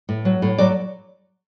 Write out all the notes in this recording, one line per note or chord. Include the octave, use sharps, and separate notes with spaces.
A2
F#3
A2
F#3 D5